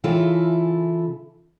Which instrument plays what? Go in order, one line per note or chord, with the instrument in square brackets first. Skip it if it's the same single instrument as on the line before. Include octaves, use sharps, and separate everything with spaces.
[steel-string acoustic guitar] C#3 E3 E4 F4 A4